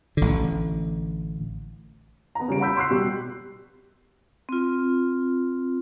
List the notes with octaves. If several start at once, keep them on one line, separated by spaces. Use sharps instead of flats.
A1 D3
B3 A#5
C#3 G3 D7
F#5 A#5 B5 E6 G6 B6
C6 C#6 E6 F#6 C7
B2 G3 G4
C4 F4